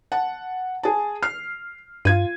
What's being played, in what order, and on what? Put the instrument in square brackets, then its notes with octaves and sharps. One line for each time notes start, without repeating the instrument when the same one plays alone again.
[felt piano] F#5 A5
G#4 A5
F6 C7
[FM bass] G2 [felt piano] F4 G#6 D#7